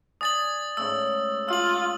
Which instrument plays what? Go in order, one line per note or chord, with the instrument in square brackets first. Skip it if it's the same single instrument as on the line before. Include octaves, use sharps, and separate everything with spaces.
[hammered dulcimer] D5 G#5 [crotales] D#6 A6 F#7
[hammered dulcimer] G#2 C#3 A3 [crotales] E6
[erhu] F4 [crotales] E6 F#7